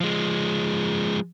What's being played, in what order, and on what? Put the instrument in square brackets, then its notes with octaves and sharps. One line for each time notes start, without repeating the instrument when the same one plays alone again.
[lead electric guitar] F3 G#3